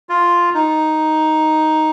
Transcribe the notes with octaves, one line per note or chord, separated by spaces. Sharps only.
F4
D#4